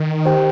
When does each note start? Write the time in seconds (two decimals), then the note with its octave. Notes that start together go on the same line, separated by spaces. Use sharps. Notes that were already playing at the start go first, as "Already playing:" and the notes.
Already playing: D#3
0.25 G4 C5 G5